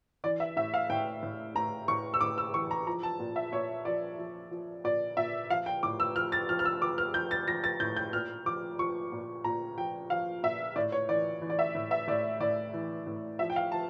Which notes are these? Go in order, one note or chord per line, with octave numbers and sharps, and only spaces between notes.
E3 D5
E5
A2 E5
F5
A2 G5
A2
A2 A#5
A2 C#6
E6
A2 D6
E6
E3 C#6
A#5
F3 A#5
A5
A#2
E5
A#2 C#5
F3 D5
F3
F3
A#2 D5
A#2 E5
F3 F5
G5
A2 D6
E6
F3 F6
A6
F3 F6
F6
E6
F3 D6
F6
F3 G6
A6
F3 A#6
A6
A2 G6
G6
A#2 F6
F3 D6
F3 C#6
A#2
A#2 A#5
F3 G5
F3 F5
A#2 E5
A2 D5
C#5
E3 D5
E3
D5
E5
A2
E5
A2 D5
A2 D5
E3
A2
F3 E5
G5
F5
F3 A5